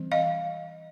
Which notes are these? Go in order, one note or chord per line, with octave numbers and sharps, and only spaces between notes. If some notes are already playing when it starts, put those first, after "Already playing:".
Already playing: E3 G3 C4
D#5 F5